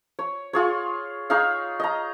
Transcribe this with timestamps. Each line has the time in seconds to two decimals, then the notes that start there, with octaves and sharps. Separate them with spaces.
0.19 C#5
0.53 F4 G#4 C#5
1.30 D#4 G#4 C#5 F5
1.80 D#5 A#5